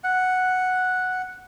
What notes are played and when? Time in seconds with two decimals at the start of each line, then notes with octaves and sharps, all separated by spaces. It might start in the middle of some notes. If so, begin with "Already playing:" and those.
0.04 F#5